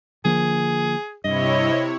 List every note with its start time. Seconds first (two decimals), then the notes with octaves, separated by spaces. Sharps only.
0.25 D3 F3 A#3 G#4
1.24 G2 C3 E4 C#5 D#5